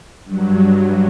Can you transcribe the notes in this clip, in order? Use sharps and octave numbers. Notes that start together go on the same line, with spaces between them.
G2 F#3